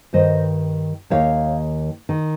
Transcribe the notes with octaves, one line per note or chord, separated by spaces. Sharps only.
G2 D#3 C5 D#5
D#2 D#3 C#5 F5
D#3